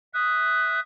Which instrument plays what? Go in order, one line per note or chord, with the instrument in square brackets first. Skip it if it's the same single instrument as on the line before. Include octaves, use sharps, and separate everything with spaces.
[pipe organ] E5 D#6 [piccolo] F#6